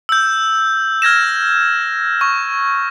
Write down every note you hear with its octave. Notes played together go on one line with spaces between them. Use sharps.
E6 G6
F6 G#6 A#6 E7
C#6